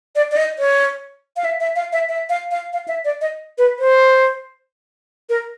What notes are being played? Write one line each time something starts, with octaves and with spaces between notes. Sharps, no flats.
D5
D5
D#5
C#5
F5
E5
E5
F5
E5
E5
F5
F5
F5
E5
D5
D#5
B4
C5
A#4